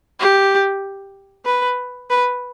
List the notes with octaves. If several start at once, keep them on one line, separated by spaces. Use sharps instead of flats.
G4
B4
B4